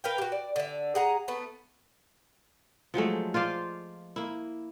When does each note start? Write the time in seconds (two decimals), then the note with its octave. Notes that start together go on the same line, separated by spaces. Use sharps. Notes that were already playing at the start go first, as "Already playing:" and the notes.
0.04 A#4 B4 F5 G5
0.18 F#4 G4
0.32 D5
0.56 D3 E5
0.95 G#4 F#5 A#5
1.28 A3 B3
2.94 F3 F#3 G#3 A3
3.34 F4 C5 D5 F5
4.16 A#3 E4